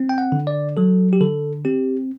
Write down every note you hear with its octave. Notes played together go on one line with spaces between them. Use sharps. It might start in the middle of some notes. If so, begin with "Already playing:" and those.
Already playing: C4
G5
F#5
D3
D5
F#3 A4
G4
D3 A4
C4 G4